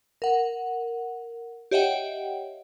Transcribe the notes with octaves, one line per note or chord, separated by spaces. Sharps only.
A#4 F#5
G4 C#5 D#5 E5 F#5 G5